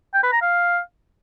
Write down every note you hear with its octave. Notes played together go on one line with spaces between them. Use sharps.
G5
B4
A#5
F5